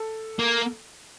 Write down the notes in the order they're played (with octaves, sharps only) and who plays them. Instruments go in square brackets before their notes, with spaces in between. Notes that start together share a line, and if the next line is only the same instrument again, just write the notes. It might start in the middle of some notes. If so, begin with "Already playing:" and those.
Already playing: [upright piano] A4
[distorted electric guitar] A#3